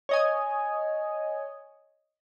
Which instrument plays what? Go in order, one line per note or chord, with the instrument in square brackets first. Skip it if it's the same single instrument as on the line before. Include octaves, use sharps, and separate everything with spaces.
[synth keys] C#5 D#5 G#5